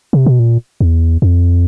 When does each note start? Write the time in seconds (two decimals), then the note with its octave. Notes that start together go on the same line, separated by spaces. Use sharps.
0.13 C3
0.26 B2
0.39 A#2
0.81 E2
1.22 F2